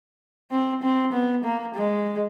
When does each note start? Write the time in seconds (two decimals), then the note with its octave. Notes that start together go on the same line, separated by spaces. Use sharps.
0.51 C4
0.83 C4
1.13 B3
1.44 A#3
1.75 G#3